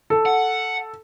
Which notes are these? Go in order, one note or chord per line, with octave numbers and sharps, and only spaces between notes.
A4
F#5